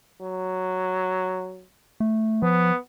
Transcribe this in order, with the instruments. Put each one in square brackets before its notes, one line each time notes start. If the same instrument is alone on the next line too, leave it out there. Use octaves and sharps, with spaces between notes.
[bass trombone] F#3
[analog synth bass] A3
[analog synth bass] F3 [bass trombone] B3